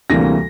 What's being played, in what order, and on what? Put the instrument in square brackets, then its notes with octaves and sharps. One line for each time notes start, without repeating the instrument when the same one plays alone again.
[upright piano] D2 C3 E3 G3 A#3 A#6